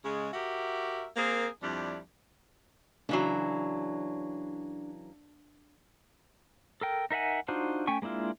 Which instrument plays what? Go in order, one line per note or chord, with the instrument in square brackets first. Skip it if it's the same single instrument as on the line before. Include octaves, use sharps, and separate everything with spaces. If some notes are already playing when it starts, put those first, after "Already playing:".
[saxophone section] C#3 G#3
F#4 G4 A#4 E5
A#3 C4 G#4 A#4
F2 G3 D4 E4
[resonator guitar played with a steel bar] C#3 E3 F#3 [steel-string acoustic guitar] D4
[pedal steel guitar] A4 A#4 G5
D#4 A#4 E5 F#5 G#5
D4 D#4 F4 F#4 C5
A3 C#4 G5 G#5 C#6
G#3 A#3 D4 E4 F4